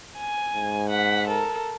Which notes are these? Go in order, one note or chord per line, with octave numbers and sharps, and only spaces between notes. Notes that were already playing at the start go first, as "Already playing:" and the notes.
G#5
G#2
F#5 B6
A4 A#4